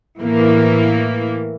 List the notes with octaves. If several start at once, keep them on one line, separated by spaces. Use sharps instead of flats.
A2 E3 A#3